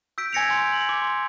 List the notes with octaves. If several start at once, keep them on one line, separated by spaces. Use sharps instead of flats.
E6 G6 B6 D7
G#5 G#6 A#6 C#7 D7 F7
C6 G6 D7
F#7
D6
C6